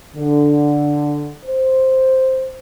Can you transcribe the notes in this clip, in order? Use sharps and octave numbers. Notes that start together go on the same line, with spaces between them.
D3
C5